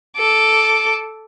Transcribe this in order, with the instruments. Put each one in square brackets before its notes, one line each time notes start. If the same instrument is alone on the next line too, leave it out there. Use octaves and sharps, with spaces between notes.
[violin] A4 D6